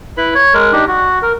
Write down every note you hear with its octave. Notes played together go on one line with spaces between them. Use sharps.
E4 B4 B5
C#5
G#3 A#4
D4 D#4 G4
F#4
A#4